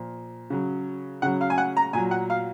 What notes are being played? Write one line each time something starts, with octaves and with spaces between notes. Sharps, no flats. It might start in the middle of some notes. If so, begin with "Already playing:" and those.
Already playing: A#2 F3
C#3 F#3
C#3 F#3 F#5
F5
G#5
F#5
A#5
A#2 F#3 G#5
F#5
F5